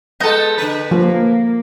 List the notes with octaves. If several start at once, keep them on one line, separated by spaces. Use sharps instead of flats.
G#3 B3 A4 D#5 G6
D3 B4
F3 A#3